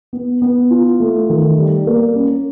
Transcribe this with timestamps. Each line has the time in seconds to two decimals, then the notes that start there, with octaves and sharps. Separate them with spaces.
0.13 B3
0.42 B3
0.71 F4
1.00 A3
1.29 D#3
1.58 G3
1.87 A#3
2.16 C#4